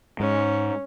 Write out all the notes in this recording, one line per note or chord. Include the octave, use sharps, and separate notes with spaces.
G#2 C#4